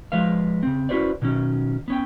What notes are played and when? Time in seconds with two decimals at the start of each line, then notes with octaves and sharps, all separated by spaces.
0.12 F3 G#3 B4 F5
0.63 C#3 C4
0.89 C#4 E4 F#4 B4 C5 D5
1.22 B2 D#3 F#3 C#4
1.88 B3 C#4 G5